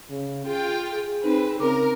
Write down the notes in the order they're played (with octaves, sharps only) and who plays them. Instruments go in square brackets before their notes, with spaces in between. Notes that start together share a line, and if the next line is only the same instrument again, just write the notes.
[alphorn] C#3
[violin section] F4 G5 [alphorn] G#4
[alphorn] G#4
[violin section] C4 B4 [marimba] D#4
[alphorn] C#3 [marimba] C4 D6 [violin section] A#4